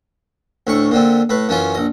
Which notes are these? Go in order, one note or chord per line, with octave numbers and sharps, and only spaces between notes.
D2 A2 C#6
A#2 D3 C4
A2 B4
F#2 E3 C#4 F4 G#5
A#1 D#5